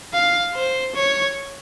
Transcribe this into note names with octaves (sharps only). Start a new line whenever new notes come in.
F5
C5
C#5